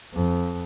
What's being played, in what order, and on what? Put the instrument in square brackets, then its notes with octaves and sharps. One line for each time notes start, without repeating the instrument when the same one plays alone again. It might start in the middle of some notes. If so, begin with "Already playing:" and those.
[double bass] F2